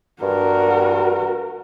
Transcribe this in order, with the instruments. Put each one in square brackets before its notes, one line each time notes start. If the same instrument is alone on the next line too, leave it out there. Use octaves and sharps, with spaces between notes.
[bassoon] G2 [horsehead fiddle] F#4 A#4